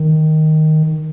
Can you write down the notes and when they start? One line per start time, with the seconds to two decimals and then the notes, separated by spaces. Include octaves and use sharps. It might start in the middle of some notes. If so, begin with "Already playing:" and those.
Already playing: D#3